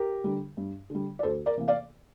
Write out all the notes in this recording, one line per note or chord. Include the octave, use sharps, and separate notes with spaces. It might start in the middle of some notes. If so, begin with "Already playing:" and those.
Already playing: G4 A#4
D3 G3
G2
D3 G3
D5
D2 A4 C5
A#4 D5
C3 E3 A#3
D5 F5